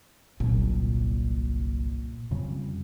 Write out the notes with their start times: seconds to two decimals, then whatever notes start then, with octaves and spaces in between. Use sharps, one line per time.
0.40 G1 C2 A#2 F#3
2.31 F2 C#3 G3